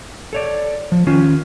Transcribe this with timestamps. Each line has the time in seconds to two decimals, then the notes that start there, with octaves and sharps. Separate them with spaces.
0.33 A4 C#5 D5
0.92 F3
1.07 D#3 C#4 F4